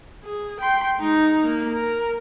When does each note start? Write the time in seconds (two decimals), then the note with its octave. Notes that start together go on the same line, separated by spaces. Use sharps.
0.24 G#4
0.60 G5 C6
0.98 G#3 D#4
1.44 A#3
1.73 A#4